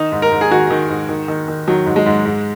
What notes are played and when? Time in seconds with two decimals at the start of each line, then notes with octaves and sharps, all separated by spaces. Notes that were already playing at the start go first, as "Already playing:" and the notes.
Already playing: D#3 D#4
0.12 G#2
0.22 A#4
0.32 G#2
0.41 G#4
0.51 D#3 F#4
0.71 D#3
0.89 G#2
1.09 D#3
1.28 D#3
1.48 D#3
1.67 D#3 F#3
1.86 G#2
1.96 G#3
2.06 G#2
2.25 G#2